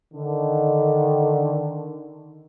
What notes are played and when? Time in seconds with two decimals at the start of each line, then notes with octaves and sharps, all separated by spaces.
0.13 D3 D#3